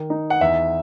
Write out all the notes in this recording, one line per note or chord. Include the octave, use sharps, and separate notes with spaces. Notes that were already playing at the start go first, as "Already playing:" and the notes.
Already playing: D#3
D#4
F#5
E2 E5